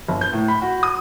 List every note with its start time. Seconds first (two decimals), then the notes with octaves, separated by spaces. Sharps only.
0.08 G1
0.21 G6
0.33 A2
0.48 B5
0.62 F#4
0.83 D#6